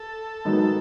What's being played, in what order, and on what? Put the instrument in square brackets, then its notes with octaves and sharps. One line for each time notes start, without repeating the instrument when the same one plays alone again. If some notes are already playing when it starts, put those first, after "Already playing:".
Already playing: [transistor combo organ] A4
[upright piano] G#2 D#3 F#3 B3 D#4